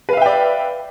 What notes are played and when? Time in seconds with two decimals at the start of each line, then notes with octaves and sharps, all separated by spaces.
0.09 B4
0.13 F5
0.17 E5
0.22 G5
0.26 D5